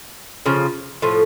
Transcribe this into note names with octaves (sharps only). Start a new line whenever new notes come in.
C#3 F3
A2 F3